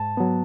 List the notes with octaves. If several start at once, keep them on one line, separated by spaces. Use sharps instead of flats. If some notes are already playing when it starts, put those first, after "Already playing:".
Already playing: G#2 A5
F#3 B3